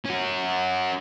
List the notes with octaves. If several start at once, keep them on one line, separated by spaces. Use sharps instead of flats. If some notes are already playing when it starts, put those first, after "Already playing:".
C#4 F#4